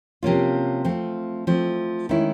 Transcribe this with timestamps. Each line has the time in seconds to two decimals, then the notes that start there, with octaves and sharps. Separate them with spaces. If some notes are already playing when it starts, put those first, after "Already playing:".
0.23 C3 F3 A#3 C#4 F4
0.85 F3 A3 C4
1.47 F3 A3 C4
2.09 D#3 G#3 C#4 E4